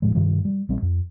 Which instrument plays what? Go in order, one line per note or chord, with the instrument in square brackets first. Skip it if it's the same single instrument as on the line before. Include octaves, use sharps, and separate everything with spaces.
[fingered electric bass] D#1 A2 F3 G#3
G2 C3 D#3 G3
G3
A#1 F#3 G3 C4
F2